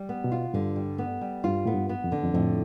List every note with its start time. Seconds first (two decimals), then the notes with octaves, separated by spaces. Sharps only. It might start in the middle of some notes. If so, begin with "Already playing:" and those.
Already playing: G3
0.09 B3
0.24 B2
0.32 F4
0.54 G2 D3
0.76 G3
0.98 B3
1.21 G3
1.44 G2 F4
1.66 A2 B3
1.74 G2
1.89 B3
2.04 F2
2.12 D3
2.23 F2
2.34 F2 A2